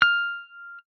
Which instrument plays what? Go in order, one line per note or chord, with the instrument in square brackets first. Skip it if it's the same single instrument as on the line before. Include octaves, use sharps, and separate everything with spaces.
[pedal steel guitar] F6